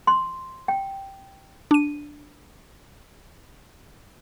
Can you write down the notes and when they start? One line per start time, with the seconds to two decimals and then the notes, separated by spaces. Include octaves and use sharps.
0.07 C6
0.68 G5
1.71 D4 D#7